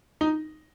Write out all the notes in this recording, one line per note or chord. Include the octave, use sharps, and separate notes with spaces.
D#4